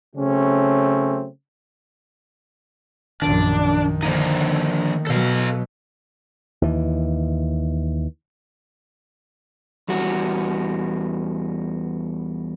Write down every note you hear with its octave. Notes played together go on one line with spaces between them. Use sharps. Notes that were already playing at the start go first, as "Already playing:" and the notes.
C#3 F#3 A3 C4 C#4
A#1 F#2 D#3 D4
D3 F3 A#3 D#4
B2 F#3 A4 F5
D#2 E3
E2 G3 F#4